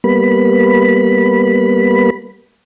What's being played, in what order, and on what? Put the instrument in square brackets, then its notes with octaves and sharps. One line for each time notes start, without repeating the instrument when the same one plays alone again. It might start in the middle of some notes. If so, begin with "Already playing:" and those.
[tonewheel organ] G3 A#3 B3 B5